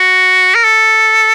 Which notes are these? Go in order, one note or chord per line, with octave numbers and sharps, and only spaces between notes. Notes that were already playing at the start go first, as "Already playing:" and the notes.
Already playing: F#4
A#4
A4